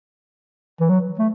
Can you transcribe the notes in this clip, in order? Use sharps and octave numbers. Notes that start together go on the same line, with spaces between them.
E3
F#3
A3